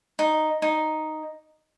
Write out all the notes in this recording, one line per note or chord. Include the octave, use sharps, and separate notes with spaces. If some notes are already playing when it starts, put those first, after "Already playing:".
D#4
D#4